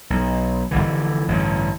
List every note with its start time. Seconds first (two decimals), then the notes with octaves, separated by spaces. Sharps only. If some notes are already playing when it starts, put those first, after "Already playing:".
0.10 B1
0.71 F1 D#2 D3 E3
1.28 A1 G2 D3